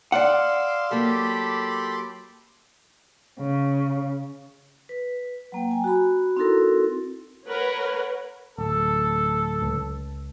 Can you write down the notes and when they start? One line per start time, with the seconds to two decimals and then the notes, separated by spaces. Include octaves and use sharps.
0.12 D5 F5 F#5 C6 D6 E6
0.91 F#3 A#3 G4 A4 B5
3.39 C#3
4.89 B4
5.52 F#3 A#3 G5
5.71 G#5
5.84 F#4 A#5 B5
6.36 C4 D#4 E4 F#4 A4 A#4
7.46 A#4 B4 C#5 F#5
8.58 D1 A4
9.62 C#2